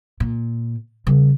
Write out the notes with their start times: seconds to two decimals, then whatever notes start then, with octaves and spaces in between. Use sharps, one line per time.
0.20 A#2
1.07 C#3 G3